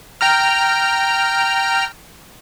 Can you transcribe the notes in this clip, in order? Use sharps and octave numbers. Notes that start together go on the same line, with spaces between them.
G5 A#5 F6